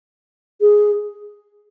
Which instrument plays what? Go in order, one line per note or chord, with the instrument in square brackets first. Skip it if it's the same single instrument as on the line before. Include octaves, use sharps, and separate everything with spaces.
[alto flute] G#4